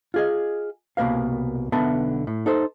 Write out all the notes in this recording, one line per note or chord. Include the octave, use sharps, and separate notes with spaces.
F4 G#4 D#5
C2 B2 A#3 B4 F5
B1 D3 B3 E5 A5
A2
D#4 A4 C5